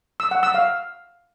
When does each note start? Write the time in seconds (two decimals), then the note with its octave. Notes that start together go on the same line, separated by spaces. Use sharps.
0.20 E6
0.31 F#5
0.43 E6
0.54 F5